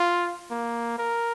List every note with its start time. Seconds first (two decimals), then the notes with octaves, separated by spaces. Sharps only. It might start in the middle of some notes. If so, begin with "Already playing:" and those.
Already playing: F4
0.51 A#3
0.98 A#4